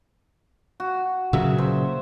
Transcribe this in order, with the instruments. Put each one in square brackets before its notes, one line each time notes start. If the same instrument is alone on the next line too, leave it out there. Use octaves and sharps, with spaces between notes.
[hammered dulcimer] F#4
[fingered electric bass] A#2 C#3 F#3 [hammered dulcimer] E5 F#5
[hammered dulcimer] C5